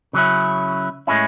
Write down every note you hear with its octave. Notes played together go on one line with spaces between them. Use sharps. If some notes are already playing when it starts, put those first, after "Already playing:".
C#3 F#3 C#4 E4
A2 G#3 C#4 E4